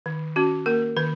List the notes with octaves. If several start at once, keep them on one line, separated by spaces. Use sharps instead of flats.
D#3
C#4 F#4
A#3 A#4
D#3 B4